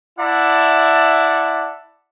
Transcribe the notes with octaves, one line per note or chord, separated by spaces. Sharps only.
E4 D5 E5 F#5 A5